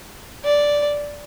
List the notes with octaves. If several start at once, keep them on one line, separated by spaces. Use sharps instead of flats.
D5